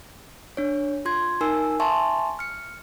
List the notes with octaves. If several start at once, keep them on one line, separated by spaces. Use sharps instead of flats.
D4 C#5
F4 C6 G#6
D#4 A#4 G#5 E6
E5 G#5 A5 C6 C#6
F6 C#7